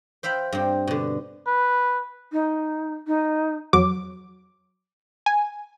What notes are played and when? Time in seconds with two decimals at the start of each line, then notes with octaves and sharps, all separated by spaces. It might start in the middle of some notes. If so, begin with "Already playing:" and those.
0.23 C5 E5 F5 G5 B5
0.52 G2 C4
0.87 B2 D3
1.47 B4
2.32 D#4
3.07 D#4
3.73 F2 F#3 D6
5.26 G#5